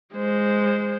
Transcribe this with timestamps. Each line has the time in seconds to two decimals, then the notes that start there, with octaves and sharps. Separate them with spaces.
0.14 G#3 C5